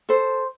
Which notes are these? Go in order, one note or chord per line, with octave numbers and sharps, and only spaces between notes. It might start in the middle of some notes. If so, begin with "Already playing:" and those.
A4 C5